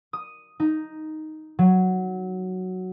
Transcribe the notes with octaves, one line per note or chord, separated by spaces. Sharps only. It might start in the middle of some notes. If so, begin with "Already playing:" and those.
D#6
D#4
F#3